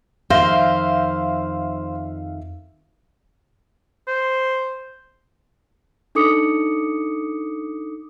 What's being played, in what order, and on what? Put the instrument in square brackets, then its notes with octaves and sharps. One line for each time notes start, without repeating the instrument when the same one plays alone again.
[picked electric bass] F2 D#3 [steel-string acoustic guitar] C5 [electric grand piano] E5 F5 A#6
[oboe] C5
[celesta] D4 D#4 A4 D6 D#6 C#7